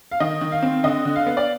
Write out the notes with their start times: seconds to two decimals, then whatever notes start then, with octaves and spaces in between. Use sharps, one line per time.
0.11 F5
0.20 D#3 D#5
0.41 D#3
0.52 F5
0.62 C4
0.84 D3 D#5
1.05 D3
1.16 F5
1.26 B3
1.37 D5